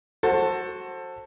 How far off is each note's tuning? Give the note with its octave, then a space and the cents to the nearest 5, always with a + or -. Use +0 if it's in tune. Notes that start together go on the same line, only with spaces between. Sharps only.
F#4 +0 A4 +15 C5 +25